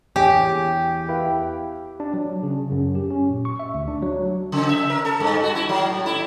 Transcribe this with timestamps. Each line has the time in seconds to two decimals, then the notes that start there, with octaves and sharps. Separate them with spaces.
0.16 E2 G4 G#4 C#5 G5 G#5
1.08 E4 B4 F5
2.00 D4
2.14 F#3
2.43 C#3
2.72 F#2
2.95 G4
3.10 C#4
3.29 A#2
3.45 C#6
3.59 E5
3.74 D2
3.88 D4
4.02 F#3
4.52 C#3
4.69 E5
4.90 A#4
5.05 A4
5.20 G2
5.43 F#4
5.55 E4
5.69 F#3
5.86 A2
6.06 E4